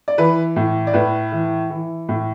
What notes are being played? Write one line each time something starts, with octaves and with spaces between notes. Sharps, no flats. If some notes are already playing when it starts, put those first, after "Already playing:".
D5
E3 B4
A2
D5
A2 B4
E3
E3
A2